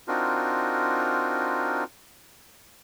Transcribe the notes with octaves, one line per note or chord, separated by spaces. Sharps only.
C4 D4 D#4 F4 F#4 A#4